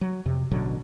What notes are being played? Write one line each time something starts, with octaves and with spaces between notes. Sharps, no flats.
F#3
F2 C3
A1 B2 D3 F#3